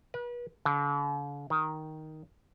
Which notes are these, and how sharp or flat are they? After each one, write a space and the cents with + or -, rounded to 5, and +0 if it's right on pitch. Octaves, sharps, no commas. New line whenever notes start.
B4 -35
D3 -45
D#3 +5